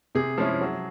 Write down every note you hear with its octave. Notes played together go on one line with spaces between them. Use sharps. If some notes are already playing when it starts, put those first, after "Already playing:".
C3 G#4
F3 G#3 C#4 E4
F#3